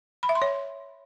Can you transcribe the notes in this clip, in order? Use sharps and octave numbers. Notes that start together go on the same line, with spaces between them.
B5
E5
C6
C#5